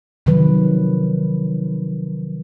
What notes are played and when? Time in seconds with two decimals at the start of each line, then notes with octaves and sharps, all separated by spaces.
0.26 C3 D#3 F3 F#3 B4